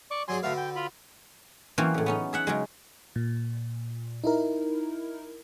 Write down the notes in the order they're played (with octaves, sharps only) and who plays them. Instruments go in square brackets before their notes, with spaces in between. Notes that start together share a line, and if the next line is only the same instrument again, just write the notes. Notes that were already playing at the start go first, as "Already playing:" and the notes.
[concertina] D5 C#6 D6
[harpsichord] F#3 D4 G#4 [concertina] G#5 C6
[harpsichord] D3 F#4 B4 [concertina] A3 F5
[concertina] G5
F4 B5
[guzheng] E3 F#3 A#3 C4 C#4 C5
A2 C#3
B3 C#4 D#4
G#4 E5 F#5
C#3 F#3 G#3
[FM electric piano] A#2
D#4 E4 A#4